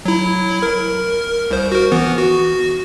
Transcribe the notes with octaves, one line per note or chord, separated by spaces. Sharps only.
F#3 E4
A#4
C2 C5
F#4 A#4
E3 B3
F#4